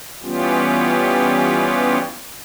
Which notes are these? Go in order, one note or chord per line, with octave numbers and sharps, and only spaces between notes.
E3 G3 B3 C#4 F4 G4